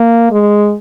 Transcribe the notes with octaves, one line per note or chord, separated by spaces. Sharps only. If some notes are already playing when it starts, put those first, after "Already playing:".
Already playing: A#3
G#3